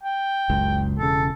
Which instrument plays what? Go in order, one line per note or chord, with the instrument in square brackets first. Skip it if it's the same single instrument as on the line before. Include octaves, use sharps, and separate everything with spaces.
[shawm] G5
[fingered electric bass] F#1 C#2
[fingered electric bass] E1 C#3 [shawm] A4